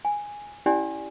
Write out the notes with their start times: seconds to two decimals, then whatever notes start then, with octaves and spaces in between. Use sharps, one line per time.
0.05 G#5
0.66 C#4 E4 G4 D5 G#5